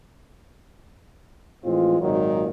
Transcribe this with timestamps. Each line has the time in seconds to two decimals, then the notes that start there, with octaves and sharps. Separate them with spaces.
1.65 A2 E3 F3 G#3 C4 F4
2.01 G#1 A#2 D#3 F#3